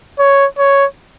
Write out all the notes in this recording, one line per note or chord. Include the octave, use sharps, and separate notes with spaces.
C#5
C#5